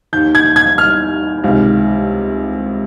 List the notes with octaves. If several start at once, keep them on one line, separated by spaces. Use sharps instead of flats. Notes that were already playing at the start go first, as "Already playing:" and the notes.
D#2 D#3 G6
G#6
G#6
F6
C#2 C3 D#3